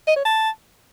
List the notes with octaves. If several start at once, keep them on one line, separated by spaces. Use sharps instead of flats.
D#5
C#5
A5